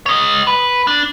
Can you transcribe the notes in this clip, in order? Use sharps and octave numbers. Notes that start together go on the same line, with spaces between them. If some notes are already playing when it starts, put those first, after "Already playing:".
C#5 D#5
B4
D4